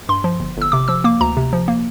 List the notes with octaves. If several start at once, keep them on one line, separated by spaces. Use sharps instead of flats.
G2 C6
F3
G1
G1 E6
C3 D6
F3 E6
A#3 D6
D2 A#5
C3
F3
A#3